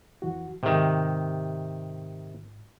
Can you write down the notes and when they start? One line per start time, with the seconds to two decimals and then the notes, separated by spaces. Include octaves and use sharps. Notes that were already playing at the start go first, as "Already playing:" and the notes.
0.22 F2 E3 F#4
0.63 G#2 C3 D#3